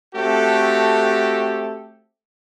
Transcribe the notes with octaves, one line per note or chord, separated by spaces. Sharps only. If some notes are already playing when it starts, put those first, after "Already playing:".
A3 C4 F#4 G4 A4